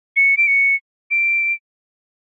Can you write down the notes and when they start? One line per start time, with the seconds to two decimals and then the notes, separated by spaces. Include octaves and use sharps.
0.16 C#7
0.37 D7
0.47 C#7
1.11 D7